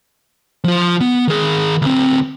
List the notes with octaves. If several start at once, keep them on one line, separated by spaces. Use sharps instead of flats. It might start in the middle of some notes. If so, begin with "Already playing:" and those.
F3 F4
B3
D#3 G#4
D2 C4